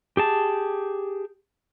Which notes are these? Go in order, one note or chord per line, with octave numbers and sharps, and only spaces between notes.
G4 G#4 A5